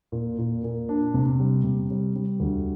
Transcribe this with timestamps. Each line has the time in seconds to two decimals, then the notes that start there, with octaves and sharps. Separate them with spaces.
0.12 A#2
0.38 A#2
0.64 A#2
0.89 D4
1.14 C3
1.40 G3
1.64 C3
1.90 G3
2.15 G3
2.40 D2